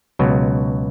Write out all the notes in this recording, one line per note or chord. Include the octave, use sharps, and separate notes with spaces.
C#2 B2 F#3